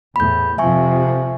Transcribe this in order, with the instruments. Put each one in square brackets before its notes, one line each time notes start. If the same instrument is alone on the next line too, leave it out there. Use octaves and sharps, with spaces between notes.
[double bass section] E2 A2 [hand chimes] B5 G6
[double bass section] F2 C3 F3 [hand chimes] E5 G#5 C#6